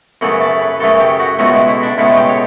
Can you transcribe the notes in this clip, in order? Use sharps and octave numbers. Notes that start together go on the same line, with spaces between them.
F#2 C#3 E3 A3 C#4 F#5
A5
B4
F#2 C#3 E3 A3 C#4 A4
G4
F#4
C#2 B2 A3 C#4 F#4
E4
E4
D4
C#2 B2 A3 C#4 E4
G4
C#5